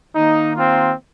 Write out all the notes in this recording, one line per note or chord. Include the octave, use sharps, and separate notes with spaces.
D#3 A#3 D#4
C4 F4